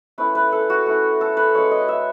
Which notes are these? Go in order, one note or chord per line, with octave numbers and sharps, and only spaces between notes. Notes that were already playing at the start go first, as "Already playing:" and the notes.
A3 C#4 E4 B4
B4
A4
F#4
A3 C#4 E4
A4
B4
G#3 C#4 E4 C#5
D#5
E5